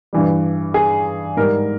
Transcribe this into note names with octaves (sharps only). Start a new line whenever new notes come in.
G2 E3 G3
G#4
G#2 G3 A#4